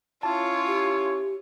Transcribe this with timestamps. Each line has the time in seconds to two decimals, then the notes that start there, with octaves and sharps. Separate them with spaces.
0.23 C#4 E4 F4 C#5 A5
0.67 G4